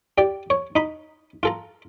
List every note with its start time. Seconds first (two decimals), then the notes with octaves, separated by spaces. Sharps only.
0.18 G4 D5
0.50 C#5
0.76 D#4 B5
1.43 F4 A4 A#5